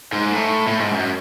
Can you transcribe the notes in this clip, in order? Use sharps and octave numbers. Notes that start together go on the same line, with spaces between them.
G#2
A2
A2
G#2
F#2